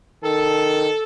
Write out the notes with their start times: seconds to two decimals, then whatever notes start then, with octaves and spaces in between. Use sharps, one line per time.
0.24 D#3 A4